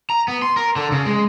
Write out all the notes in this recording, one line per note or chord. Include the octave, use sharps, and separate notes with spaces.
A#5
B3
C6
A#4
D3
C#3
G#3